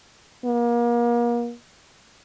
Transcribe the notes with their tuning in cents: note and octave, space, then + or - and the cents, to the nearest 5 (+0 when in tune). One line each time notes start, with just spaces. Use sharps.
A#3 +35